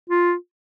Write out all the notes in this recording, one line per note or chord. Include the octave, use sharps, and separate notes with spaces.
F4